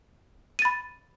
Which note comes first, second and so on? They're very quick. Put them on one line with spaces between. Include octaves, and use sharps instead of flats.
D#7 A6 B5